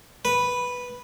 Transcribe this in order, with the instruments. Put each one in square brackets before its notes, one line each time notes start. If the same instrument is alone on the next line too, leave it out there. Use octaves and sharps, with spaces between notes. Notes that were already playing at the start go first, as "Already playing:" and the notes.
[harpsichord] B4